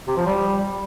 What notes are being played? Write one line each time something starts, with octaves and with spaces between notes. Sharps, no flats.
C3
F3
G3